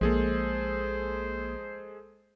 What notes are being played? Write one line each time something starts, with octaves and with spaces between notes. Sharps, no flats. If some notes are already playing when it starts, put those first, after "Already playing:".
A#1 F3 G#3 A#3 G#4 A4 C5